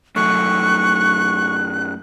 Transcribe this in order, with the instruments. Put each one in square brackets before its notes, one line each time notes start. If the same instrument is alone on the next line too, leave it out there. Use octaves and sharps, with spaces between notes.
[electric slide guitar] F#2 A3 [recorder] C#6 [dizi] F#6